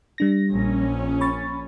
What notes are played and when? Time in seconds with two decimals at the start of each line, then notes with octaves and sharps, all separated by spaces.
0.18 G3 D4 A#6
0.49 A#1 C#4
1.21 B5 C#6 A6